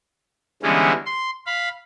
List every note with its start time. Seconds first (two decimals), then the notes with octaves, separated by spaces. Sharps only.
0.63 D3 E3 G3 G#3 B3 C#4
1.06 C6
1.46 F5 B5